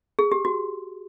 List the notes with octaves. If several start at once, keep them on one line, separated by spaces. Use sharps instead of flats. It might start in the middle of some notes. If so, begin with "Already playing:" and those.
G#4
G4
F#4